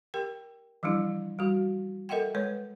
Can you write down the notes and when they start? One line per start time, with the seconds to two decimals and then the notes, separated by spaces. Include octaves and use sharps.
0.14 G4 A#4 G5
0.83 E3 F3 G3 D4 E4
1.39 G3 F#4
2.09 A4 A#4 D#5 E5 F#5 G5
2.35 G#3 B4 C#5